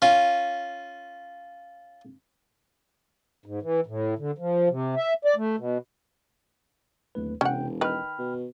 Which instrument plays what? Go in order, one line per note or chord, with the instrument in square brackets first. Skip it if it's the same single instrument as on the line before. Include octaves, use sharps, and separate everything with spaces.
[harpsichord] C#4 F4
[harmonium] G#2
E3
A2
D3
F3
C3
E5
D5
A3
B2
[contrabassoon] D1 [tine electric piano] D#2 A3 B4
[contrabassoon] E1 [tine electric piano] C3 G5 [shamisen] C#4 F#5
[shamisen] D#3 B4 [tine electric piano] G5 B5 F6
[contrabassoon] B2